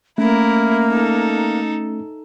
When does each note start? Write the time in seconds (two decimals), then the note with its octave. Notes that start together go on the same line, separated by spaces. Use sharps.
0.18 A3 A#3 C#4 E4 A#4
0.90 D#4 A4